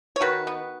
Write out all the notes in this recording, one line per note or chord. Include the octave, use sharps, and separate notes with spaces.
C#5
D#3 F#4 B4
B3